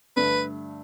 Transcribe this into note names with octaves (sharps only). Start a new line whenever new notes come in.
G2 D3 A3 B4